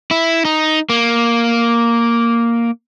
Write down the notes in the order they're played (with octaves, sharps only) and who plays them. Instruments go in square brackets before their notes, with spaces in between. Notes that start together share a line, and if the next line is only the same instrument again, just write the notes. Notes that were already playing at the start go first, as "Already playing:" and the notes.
[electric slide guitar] E4
D#4
A#3